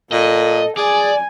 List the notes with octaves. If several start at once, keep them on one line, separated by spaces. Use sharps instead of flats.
A#2 A4 D#5
G#4 D5 G#5